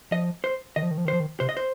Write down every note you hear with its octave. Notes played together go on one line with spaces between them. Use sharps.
F3 D#5
C5
D#3 D#5
F3
D#3
F3
D#3
C5
F3
D#3
C3 C5
D#5
C5